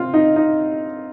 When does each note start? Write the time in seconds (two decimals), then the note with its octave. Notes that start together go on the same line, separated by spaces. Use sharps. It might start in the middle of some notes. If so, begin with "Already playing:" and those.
Already playing: C4 F4
0.14 D#4
0.36 D#4